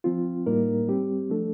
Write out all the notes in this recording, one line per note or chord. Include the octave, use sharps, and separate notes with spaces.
F3 C4 F4
A2 G3 A#3 D#4 A#4
G3 C4 G4
F3 A3 D4 A4